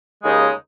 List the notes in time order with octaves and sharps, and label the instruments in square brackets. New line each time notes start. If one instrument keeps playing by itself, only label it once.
[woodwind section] D#2 C#3 G#3 D#4